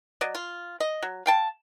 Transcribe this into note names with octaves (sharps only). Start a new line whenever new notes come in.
F#3 D5 D#5
F4
D#5
F#3
F5 G5 A5